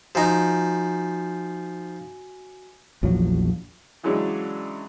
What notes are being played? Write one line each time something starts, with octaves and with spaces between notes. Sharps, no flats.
F3 D#4 F#4 G#5
A#1 E2 F3 F#3
C#3 E3 F#3 G#3 C#4 D4